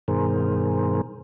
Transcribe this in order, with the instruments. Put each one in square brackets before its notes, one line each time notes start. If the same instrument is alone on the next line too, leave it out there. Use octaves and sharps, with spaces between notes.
[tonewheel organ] G2 B2 D#3 G#4 A#4 C5